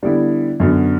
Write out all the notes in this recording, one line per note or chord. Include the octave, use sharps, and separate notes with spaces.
D3 G3 B3 E4
F#2 D3 F#3 B3